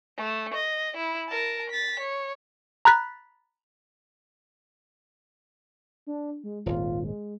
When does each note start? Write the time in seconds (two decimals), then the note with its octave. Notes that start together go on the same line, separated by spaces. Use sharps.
0.17 A3
0.54 D#5
0.97 E4
1.29 A#4 A5
1.70 A6 B6
2.00 C#5
2.85 A#5 B5 F#6 A6 B6
6.07 D4
6.44 G#3
6.66 D#1 G#1 F4
7.04 G#3